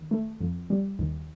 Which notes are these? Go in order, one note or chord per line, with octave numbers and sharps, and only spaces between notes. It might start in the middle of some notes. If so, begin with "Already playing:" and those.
Already playing: D#2
A3
F2
G3
D#2